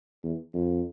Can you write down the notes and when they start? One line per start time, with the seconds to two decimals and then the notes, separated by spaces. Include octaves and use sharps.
0.24 E2
0.54 F2